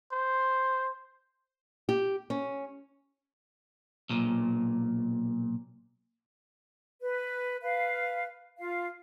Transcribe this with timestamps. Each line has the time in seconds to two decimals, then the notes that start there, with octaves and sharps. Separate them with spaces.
0.12 C5
1.89 G4
2.30 C#4
4.10 B1 A#2
7.00 B4
7.62 B4 F5
8.59 F4 F5